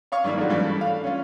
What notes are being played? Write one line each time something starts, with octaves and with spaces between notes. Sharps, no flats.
C#5 F5 C#6
G2 D#3 A#3 D4 E4
G#2 F3 A3 D4 F#4
G2 E3 G3 A3 C#4
F5
C#4 F4